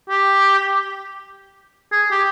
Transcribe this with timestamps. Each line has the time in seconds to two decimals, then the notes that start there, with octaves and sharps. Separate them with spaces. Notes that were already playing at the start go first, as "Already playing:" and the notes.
0.09 G4
1.92 G#4
2.11 G4